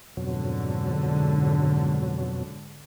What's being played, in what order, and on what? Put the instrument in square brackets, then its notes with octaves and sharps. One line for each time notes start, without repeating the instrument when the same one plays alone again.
[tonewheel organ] F2 B2 F#3 [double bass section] G#2 D3